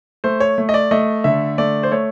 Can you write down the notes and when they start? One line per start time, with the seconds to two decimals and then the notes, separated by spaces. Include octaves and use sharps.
0.24 A3 C5
0.40 C#5
0.58 A3
0.69 D#5
0.74 D5
0.91 A3 D#5
1.24 D3 E5
1.58 A3 D5
1.83 C5
1.91 A3 C#5